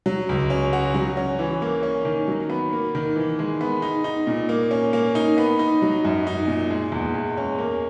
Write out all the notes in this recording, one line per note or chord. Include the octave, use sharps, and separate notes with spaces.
F#3
C#2
C#4
F#4
F#3
C#4
E3
A#3
C#4
D#3
F#3
B3
A#3
D#3
E3
G#3
B3
D#4
D#4
A#2
A#3
C#4
A#3
D#4
B3
D#4
F#3
F#2
D#4
A#2
G#3
E2
G#3
C#4
A#3